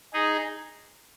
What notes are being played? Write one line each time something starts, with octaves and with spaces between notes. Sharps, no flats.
D#4 G#4